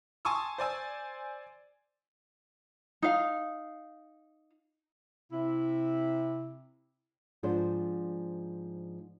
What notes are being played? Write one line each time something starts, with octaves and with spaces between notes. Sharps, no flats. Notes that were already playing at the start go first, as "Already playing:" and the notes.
G#5 A5 C6 C#6 D#6 E6
C5 D5 G#5 E6
D#4 F5
C3 E4
G#2 F3 D4 C5